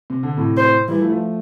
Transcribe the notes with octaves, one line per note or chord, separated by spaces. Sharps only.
C3
D3
A2 C3
C5
E3 G3 E4
F3 A3
F3 A3